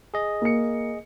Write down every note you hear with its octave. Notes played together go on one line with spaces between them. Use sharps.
G#4 D#5
A#3 C#7